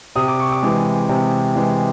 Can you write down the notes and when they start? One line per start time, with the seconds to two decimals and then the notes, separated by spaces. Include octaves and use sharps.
0.16 C3 D#6
0.28 D6
0.40 C#6
0.52 D6
0.63 E3 G#3
1.09 C3
1.55 E3 G#3